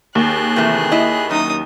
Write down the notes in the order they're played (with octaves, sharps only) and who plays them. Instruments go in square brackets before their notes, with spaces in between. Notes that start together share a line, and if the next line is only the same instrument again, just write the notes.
[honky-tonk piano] D#2 [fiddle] G#4 F#6
[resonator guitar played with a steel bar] C3 E3 A3
E4 D#5
[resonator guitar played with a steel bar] F#2 [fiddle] D#4 D#6